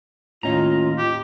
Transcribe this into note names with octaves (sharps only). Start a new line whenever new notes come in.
D#2 A2 C#4 F4 D#5 A#5
G4